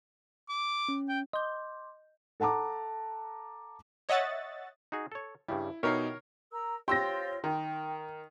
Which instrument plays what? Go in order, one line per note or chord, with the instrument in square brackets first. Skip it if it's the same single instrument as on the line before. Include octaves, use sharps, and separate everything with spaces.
[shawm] D6
[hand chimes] C#4
[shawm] G5
[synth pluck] D#5 G6 [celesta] C6 D6
[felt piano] A4 F#5 A5 A#5 D6
[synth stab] C#5 D#5 E5 F#5 A6
[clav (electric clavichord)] D#4 F#4 G#4
A4 C#5
[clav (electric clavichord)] G2 C#3 G3 [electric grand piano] E4
[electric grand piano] B2 D#4 C7 [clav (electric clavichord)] E4 G4 [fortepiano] A#4 C#5
[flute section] A#4 A#5 E6
[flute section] F4 C5 C#5 [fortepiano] G4 E6 [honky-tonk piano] C6 A#6
[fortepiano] D#3 [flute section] G5